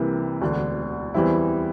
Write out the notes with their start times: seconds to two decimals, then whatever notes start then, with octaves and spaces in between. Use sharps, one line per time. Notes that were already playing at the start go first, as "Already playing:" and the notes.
Already playing: C2 C3 E3 A#3 E4
0.42 E1 D2 D3
1.14 E2 E3 G3 C4 E4